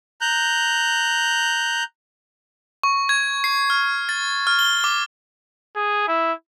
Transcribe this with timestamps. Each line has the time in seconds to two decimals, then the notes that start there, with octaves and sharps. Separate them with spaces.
0.21 A#5 F#6 G6
2.83 C#6
3.09 G#6
3.44 C7
3.70 F6
4.09 A6
4.47 F6
4.59 G7
4.84 D6
5.76 G#4
6.08 E4